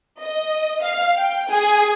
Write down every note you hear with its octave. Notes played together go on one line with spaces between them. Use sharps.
D#5
F5
G5
G#4